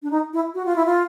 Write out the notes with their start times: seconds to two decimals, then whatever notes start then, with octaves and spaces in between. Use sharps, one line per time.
0.03 D4
0.11 D#4
0.33 E4
0.55 F#4
0.65 F4
0.76 E4
0.86 F4